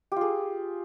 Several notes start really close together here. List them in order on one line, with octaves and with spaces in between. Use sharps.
G4 F4 G#4